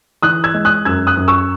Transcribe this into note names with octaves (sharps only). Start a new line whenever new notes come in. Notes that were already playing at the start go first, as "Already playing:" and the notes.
E3 D#6 F#6
E6 G#6
G#3
D#6 F#6
F#2 E6 G#6
D#6 F#6
F#2
C#6 E6